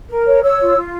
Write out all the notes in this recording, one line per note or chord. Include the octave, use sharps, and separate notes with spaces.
A#4
C#5
C#5 E6
F4
F4